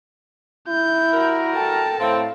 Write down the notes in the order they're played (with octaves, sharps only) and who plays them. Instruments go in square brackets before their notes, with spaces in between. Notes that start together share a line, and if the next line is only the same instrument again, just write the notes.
[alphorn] E4 [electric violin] G6
[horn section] G3 F#4 A#4
[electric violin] A4 A5 [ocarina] G5
[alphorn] A2 [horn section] C4 [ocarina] F5